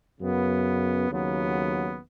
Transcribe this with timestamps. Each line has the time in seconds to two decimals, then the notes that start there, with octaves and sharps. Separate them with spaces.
0.19 F#2 C#3 B3
1.09 D#2 C#3 F#3 B3